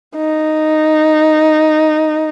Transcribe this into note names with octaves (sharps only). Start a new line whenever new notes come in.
D#4